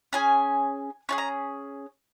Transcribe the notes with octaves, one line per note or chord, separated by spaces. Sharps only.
C#4 G#4 G#5
C#4 F4 G#4 C#6
A#5